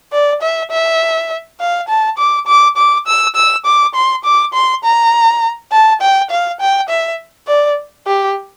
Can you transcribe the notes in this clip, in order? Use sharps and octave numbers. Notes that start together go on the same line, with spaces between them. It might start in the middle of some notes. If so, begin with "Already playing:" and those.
D5
E5
E5
F5
A5
D6
D6
D6
E6
E6
D6
C6
D6
C6
A#5
A5
G5
F5
G5
E5
D5
G4